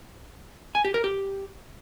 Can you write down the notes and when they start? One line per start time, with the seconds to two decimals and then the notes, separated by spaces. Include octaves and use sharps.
0.75 G#5
0.85 G4
0.94 A#4
1.04 G4